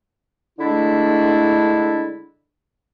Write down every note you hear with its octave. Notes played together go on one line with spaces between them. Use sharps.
D3 G#3 A3 D4 E4